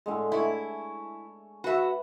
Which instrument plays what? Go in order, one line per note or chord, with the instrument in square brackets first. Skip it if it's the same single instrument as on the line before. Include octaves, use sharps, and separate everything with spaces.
[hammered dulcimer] A2 D3 G#3
[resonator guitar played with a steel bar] E4 [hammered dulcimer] C#5 G#5 A5
[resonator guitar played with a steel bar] F#4 E5 [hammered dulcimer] B4